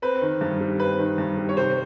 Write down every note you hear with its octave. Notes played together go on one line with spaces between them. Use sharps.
C4 B4
D#3
G2
G3
C4 B4
D#3
G2
G3
C#5
C3 C5